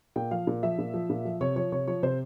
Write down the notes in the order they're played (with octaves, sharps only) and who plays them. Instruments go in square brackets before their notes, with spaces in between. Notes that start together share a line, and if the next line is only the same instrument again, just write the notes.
[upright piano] A#2 G5
F3 F5
A#2
F3 E5
A#2
F3
A#2
F3
C3 C#5
F3 C#5
C3 C#5
F3 C#5
C3 C5